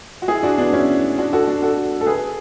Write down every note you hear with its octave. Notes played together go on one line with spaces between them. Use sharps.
F#4
E4 G#4
D4 F#4
B3 D4
C#4 E4
D4 F#4
F#4 A4
D4 F#4
F#4 A4
A4
G#4 B4